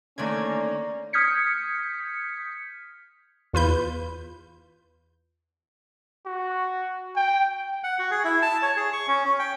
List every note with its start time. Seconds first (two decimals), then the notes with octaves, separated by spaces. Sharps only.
0.18 D3 D#3 A3 A#3 C#4 D5 G#6
1.13 D#6 F6 G6 G#6 B6 C#7
3.53 E2 F4 B4 G6
6.26 F#4
7.16 G5
7.84 F#5
7.99 F#4
8.11 G#4
8.24 E4
8.42 A5
8.62 C#5
8.77 G#4
8.93 C#6
9.08 C#4
9.25 C#4
9.39 G5